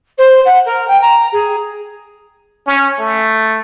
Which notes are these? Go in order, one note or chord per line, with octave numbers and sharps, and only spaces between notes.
C5
F#5
A#4
G5
A#5
G#4
C#4
A3